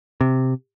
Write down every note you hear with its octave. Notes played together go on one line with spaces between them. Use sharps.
C3